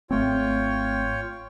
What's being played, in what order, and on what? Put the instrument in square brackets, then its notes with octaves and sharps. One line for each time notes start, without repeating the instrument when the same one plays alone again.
[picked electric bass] G#1 A3 C4 [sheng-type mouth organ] F4 C#5 G5